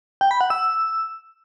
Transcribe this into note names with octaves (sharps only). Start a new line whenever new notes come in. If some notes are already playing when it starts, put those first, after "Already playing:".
G5
B5
F#5
E6